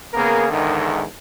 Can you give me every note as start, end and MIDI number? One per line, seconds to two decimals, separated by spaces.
0.14 0.47 49
0.14 0.47 58
0.14 0.47 59
0.14 0.47 68
0.14 0.47 70
0.49 1.02 40
0.49 1.02 44
0.49 1.02 50
0.49 1.02 51